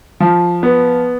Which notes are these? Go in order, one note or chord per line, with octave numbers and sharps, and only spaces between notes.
F3
B3